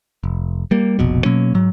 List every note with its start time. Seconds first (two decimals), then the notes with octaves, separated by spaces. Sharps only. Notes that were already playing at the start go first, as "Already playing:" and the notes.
0.24 F1
0.71 G3 A#3
0.99 F1 A#1 B2
1.25 B2 F#3 A#3 C#4
1.54 G#2 F#3